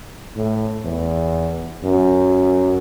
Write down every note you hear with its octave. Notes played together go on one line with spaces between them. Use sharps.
A2
E2
F#2